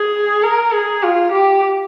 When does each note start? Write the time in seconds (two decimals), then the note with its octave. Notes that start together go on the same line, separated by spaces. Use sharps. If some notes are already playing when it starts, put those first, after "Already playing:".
Already playing: G#4
0.42 A#4
0.72 G#4
1.03 F4
1.32 G4